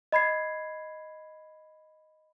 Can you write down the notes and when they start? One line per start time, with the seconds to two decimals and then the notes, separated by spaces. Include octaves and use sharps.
0.12 D#5 B5 G#6 C7